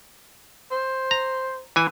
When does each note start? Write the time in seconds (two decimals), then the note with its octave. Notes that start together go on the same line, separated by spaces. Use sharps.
0.71 C5
1.11 A#5
1.76 E3 G#5